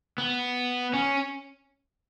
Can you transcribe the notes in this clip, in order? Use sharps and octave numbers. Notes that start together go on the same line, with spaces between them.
B3
C#4